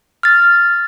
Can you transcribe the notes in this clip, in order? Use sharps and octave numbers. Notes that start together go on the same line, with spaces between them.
F6 A6